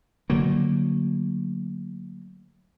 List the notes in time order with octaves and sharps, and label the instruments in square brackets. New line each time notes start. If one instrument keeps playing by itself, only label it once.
[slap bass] D3 F#3 A3 A#3